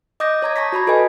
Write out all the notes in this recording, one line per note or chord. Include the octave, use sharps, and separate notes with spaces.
D#5 D6 D#6 G6 A#6
C#5 A#5 G#6
A5 C#6 A#6 B6
F#4 C#5 B5 G#6
F#4 A4 B4 D#5 G#5